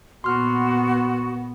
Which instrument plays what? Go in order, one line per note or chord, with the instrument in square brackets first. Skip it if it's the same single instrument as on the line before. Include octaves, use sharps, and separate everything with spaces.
[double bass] A#2 B3 [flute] F#4 [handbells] C6 F6